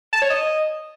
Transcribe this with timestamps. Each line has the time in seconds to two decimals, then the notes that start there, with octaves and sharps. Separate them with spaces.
0.13 A5
0.21 C#5
0.30 D#5